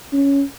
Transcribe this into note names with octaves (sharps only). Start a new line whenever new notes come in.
C#4